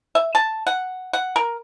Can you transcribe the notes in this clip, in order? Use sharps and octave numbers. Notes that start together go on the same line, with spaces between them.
E5
A5
F#5
F#5
A#4